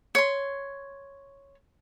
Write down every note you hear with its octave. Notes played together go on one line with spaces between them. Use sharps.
C#5 C6